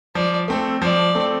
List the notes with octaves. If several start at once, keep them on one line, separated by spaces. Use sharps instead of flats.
F3 D5
A3 C4 A4
F3 D5
A3 C4 A4